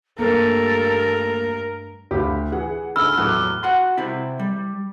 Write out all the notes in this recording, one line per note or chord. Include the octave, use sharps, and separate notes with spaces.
G2 G3 A3 A#3 A4 A#4
D2 G4 F5 B5
E3 G#4 F#5
D2 G#2 D3 B5 E6 F6
E2 A2 F#3 D6 D#6 F#6
F#4 F#5 C6
C3 C4 E4
G3